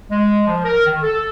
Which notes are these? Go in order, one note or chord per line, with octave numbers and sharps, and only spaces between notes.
G#3
F3
A#4
D#3
A4